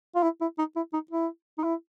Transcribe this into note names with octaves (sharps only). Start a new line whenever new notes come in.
F4
E4
E4
D#4
E4
D#4
E4
D#4
E4